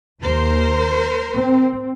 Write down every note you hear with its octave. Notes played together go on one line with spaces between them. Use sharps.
D#2 A#4 C5
C4